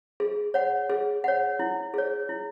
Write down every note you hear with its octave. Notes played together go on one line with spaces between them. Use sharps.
G#4
C#5 F#5
G#4
C#5 F#5
E4
G#4 C#5
E4